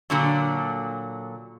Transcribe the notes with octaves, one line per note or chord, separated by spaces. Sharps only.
A#2 D3 F#3